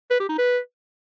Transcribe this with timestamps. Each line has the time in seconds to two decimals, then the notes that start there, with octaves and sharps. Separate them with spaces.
0.10 B4
0.20 G4
0.29 D#4
0.38 B4